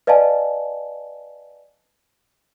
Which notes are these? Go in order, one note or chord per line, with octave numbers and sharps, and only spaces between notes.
B4 D5 D#5 F5 G#5 A5